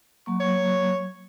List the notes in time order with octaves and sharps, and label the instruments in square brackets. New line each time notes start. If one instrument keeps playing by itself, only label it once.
[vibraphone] F#3 A#3 C#6
[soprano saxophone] C#5